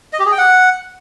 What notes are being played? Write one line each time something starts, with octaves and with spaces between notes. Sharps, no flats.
D#5
G4
G#4
G5
F#5